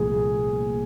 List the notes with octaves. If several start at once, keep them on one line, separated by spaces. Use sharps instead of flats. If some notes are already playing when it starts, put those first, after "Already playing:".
Already playing: C2 A#2 F3 A3 G#4